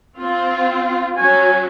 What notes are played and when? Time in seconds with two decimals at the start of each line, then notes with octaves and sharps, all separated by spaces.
0.19 C4 F4
1.17 F#3 C#4 F#4 G#5